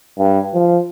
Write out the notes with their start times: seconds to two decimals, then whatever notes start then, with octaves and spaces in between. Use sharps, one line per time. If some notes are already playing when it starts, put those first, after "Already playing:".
0.18 G2
0.54 F3